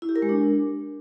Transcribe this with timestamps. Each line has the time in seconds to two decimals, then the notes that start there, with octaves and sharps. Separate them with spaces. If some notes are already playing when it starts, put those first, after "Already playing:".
0.02 E4
0.09 G4
0.16 A#4
0.22 G#3
0.29 D4